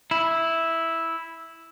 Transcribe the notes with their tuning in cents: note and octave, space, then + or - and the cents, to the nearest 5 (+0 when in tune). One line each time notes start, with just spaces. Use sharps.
E4 -5